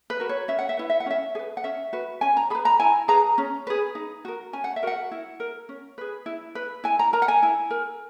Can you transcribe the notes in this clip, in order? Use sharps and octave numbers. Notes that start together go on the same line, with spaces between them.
B4
F#4 A#4
C#5
C#4 E5
F#5
E5
E4 B4 F#5
E5
F#5
C#4 E5
G#4
B4
F#5
C#4 E5
F#4 B4
C#4 G#5
A#5
G#4 B4 B5
A#5
E4 G#5
G#4 B4 A#5
C#4
G#4 B4
D#4
F#4 A#4
C#4 G#5
F#5
E5
F#4 A#4 F#5
E4
A#4
C#4
G#4 B4
E4
B4
E4 G#5
A#5
A#4 A#5
F#5
G#5
E4
A#4